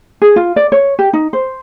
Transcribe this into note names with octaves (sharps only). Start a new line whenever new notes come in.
G#4
F4
D5
C#5
G4
D#4
C5